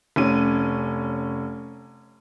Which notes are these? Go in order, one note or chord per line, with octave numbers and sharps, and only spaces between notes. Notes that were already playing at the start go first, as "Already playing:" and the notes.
F1 C#4 D#7